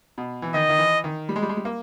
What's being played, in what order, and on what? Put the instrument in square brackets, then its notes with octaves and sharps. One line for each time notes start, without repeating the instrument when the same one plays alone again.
[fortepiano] B2
E3
[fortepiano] D#3 [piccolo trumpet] D#5
[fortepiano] D#3
E3
D#3
G3
G#3
G3
G#3
G3
A#3